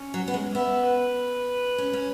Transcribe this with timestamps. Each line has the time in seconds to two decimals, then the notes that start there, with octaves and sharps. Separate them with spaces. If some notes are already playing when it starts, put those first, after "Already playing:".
Already playing: C#4
0.14 F#3
0.28 B3
0.34 G#3
0.55 B3 E5
0.86 B4
1.78 C#4
1.93 C#4